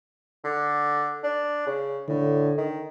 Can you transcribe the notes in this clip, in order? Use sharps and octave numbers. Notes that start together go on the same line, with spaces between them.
D3
D4
C#3
A2 D3
D#3